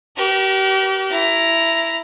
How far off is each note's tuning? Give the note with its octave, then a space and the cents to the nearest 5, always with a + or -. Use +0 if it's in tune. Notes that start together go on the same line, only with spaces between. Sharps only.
G4 -35 A#4 +40
E4 +10 A#5 +0